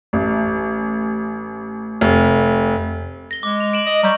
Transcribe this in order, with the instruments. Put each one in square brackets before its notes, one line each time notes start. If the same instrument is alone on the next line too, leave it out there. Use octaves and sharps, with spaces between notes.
[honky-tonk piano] A1
F1
[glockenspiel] A#6 G7
[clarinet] G#3 [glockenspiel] D6
[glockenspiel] F7
D7 E7 F#7
[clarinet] D#5
[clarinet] G3 [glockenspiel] A#5 C#6 G6